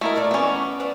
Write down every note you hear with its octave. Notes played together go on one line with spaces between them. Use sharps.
A3 E4 A#4 D#5 A#5
F4 A4 D5
E3 B3 C#4 D4
B4 C5 D5